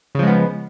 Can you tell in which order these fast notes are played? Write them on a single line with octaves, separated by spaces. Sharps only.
C#3 F3 G#3 B3